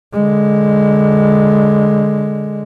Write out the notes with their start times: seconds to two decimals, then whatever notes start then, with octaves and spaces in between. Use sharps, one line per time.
0.13 D3 G#3